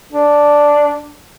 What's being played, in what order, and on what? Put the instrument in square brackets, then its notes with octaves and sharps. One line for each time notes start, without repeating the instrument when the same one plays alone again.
[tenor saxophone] D4